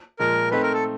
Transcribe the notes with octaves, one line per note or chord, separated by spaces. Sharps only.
A#2 F3 G#3 A#4
A3 C4 D#4 B4
A#4
A4